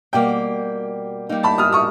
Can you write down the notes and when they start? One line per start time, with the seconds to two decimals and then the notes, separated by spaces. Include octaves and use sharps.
0.13 B2 G3 A#3 G5
1.29 G3 A#3 D#4
1.43 A5 B5
1.58 D#6 F6
1.72 C#6 D#6